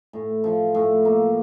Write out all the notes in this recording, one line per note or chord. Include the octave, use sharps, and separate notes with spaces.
A2
F3
A2
A#3